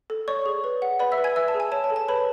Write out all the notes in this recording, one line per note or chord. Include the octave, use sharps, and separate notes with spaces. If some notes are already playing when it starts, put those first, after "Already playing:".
A4
C#5 D5 C#6
G#4
B4
F#5
B4 D5 B5
E5 E6
B4
G#5 G#6
B4 E5 E6
A5
G#4
G#5
C#5 A5
A5
A4
A5
B4 C#5 B5